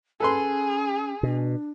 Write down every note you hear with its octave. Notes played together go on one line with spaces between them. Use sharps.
C#4 G#4 A4 B4 C6
B2 D4